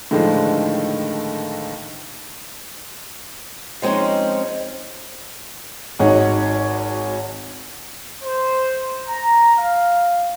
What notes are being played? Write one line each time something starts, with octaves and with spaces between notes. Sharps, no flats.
A2 D3 D#3 F3 G#3
F3 G#3 C4 C#4 D#4
G#1 D#4 F#4 G#4 C#5 F#5
C5
A#5
F5